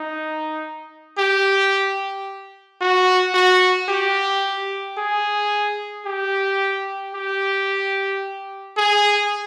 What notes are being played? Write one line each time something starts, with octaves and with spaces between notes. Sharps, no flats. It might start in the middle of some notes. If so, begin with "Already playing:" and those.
Already playing: D#4
G4
F#4
F#4
G4
G#4
G4
G4
G#4